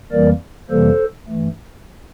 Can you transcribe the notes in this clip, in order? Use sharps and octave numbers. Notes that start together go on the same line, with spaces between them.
F2 E3 G3 A#3 A#4 D5
F2 C3 E3 G3 A#3 A4 C5
G2 E3 A3